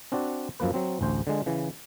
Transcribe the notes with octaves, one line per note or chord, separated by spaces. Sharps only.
C4 D4 F#4 D5
F#2 F3 A#3 B4
F#3 C4
A1 D2 C5
D3 G#3
C#3 E3